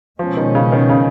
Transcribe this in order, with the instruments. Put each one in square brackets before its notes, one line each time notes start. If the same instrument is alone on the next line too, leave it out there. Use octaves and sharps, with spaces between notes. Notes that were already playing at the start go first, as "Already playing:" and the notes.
[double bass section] B2 G#3 C#4 [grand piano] F3
[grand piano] D#3
C#3
D#3
C#3